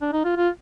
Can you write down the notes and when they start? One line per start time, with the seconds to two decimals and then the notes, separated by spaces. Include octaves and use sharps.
0.01 D4
0.13 D#4
0.25 F4
0.36 F4